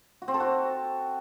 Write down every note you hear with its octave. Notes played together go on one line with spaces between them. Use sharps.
F#4
C4
A4
F#4